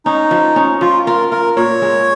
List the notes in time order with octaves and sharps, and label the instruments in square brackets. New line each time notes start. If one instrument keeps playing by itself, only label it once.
[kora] C#4 [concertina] D#4
[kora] F3
C#4
[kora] F3 [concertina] F4
[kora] F4 [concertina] A#4
[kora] F4 [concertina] A#4
[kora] A#2 [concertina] C#5
[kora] G#3